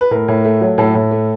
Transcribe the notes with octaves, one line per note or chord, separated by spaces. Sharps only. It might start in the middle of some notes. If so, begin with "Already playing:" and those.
B4
A2 A#4
A2
A3
F#3
A2 A4
A2
A3